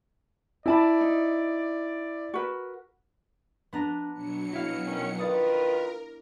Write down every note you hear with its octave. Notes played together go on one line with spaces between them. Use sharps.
E4 A#4 D5 A5 B5
D#4
F#4 A#4 B4
B3 D4 A#5
B2 F#3 C#7
E4 F5
D#3 C#4
D#3 F4 A#4 B4 D5 D#6